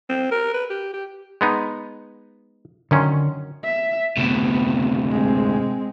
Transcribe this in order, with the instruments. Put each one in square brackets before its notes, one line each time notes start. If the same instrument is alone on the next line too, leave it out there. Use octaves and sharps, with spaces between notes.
[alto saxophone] C4
A#4
B4
G4
G4
[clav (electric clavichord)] G#3 B3 D#4
[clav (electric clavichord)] F#2 D#3 C#4 [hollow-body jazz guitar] D3 C6
[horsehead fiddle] E5
[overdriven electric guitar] D2 C3 [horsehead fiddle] B3
[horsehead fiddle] G#3 C4